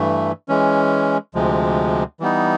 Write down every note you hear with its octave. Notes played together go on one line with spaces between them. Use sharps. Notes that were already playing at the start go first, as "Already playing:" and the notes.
Already playing: G2 E3 A3
E3 G#3 C#4
D2 C3 F3 G#3
E3 G3 B3 D#4